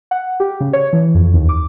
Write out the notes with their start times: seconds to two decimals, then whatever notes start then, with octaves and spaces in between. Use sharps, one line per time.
0.11 F#5
0.40 G4
0.60 C#3
0.73 C#5
0.93 E3
1.15 F2
1.34 D#2
1.49 D6